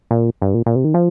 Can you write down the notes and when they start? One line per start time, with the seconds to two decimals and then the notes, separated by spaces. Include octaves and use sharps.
0.11 A#2
0.42 G2
0.54 A#2
0.66 A#2
0.76 C3
0.85 D#3
0.94 F3